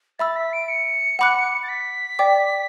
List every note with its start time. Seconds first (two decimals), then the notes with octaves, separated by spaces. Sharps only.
0.19 E5 B5 E6 A6
0.36 B6
0.53 D7
0.69 C#7
1.19 F#5 B5 D6 F#6
1.63 A6
1.69 B6
2.19 D5 G5 D6